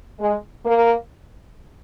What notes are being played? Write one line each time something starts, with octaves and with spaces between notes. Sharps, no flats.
G#3
A#3